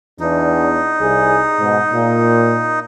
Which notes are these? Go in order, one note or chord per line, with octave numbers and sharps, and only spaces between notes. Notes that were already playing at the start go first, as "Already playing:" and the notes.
E2 D4 D#4
C2 G#4
G#2 B2
A#2